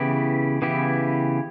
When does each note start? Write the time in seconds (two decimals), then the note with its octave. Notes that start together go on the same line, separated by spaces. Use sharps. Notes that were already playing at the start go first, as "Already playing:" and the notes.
Already playing: C#3 E3 B3 E4 G4
0.62 C#3 E3 B3 E4 G4